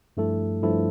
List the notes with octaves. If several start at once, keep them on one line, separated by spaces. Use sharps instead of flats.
G2 F3 A3 E4 A4
G2 F3 A3 E4 A4